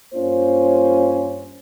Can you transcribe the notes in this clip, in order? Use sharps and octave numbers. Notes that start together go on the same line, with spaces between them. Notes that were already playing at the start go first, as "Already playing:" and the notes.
G2 A#3 C#4 F4 C5